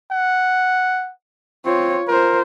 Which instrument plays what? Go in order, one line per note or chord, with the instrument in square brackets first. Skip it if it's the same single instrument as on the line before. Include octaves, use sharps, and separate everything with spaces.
[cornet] F#5
[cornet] C4 [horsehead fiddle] F4 C#5
[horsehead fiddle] F4 C5 [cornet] A#4